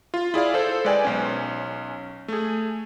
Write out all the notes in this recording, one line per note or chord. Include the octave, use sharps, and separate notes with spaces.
F4
E4 G#4 D5 F5
A4 C5
G#3 B4 D5 G5 G#5
B1 C#4
A3 G#4